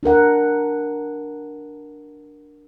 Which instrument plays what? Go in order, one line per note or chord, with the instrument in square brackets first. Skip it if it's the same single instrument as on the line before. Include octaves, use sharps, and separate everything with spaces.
[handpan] D4 F#4 A#4 F#5